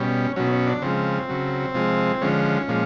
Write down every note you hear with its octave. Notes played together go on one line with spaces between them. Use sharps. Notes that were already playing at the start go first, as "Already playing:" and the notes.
Already playing: B2 G3 C#4
B2 F#3 C#4
C#4
D4
C#3 F3 G#3 C4
C#3 F#3
C3 F3 G#3
D3 F3 G#3 C#4
A#2 F3 G#3